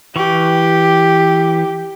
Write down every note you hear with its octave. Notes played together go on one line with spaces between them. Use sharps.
E3 G4 C#6